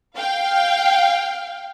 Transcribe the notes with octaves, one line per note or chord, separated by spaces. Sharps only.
F5 G5